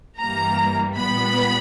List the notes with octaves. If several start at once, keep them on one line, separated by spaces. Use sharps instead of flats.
G2 E3 G3 A#3 A#5
A#2 G3 B3 B5